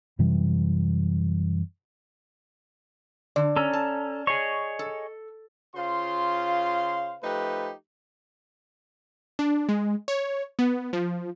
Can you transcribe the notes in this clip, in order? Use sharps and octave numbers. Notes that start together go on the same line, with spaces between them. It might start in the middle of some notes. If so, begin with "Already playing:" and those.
F#2 C3 E3 G3
D3 D5
C#4 A4 A#5 E6
A5
G#4 C#5 D#5 C#6
A4
C#3 F4 C5 F5 C6
F3 A3 D#4 G4 B4
D4
G#3
C#5
B3
F3